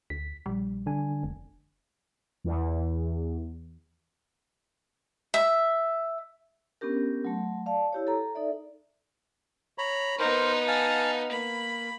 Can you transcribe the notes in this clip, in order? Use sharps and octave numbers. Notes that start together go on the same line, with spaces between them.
D2 B6
A#1 G3
D3 D4 G#5
F1
E2
E5
B3 C#4 D4 G4 A#4
F#3 A3
D5 F5 A5
E4 G4 C#5
A4 A#5
D#4 A4 D5 E5
C#5 A#5 B5
B3 D#4 A#4 C5
F5 G#5 A5
A#3 B5